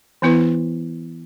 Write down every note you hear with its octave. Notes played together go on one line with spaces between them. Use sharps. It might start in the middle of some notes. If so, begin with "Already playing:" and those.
E3 B3 E4 B4